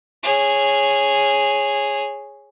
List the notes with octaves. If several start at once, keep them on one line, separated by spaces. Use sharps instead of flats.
G#4 C#5